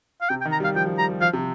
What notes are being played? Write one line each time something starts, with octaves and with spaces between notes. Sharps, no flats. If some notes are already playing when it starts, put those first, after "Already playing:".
F5
C3 G5
G5
D#3
A#5
G3
F5
F3 G5
F3
G3 A#5
G3
F3 F5
C3